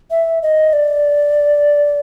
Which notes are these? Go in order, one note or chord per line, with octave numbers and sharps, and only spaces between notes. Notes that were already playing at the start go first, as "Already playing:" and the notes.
E5
D#5
D5